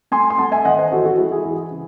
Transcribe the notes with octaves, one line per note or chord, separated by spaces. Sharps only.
A3 G#5 C6
C6
A3 F#5 A5
E5 G#5
D#3 D#5 F#5
C5 D#5
E3 F#4 A4
F#4 A4
G#3 E4 G#4
E4 G#4
E3
C#3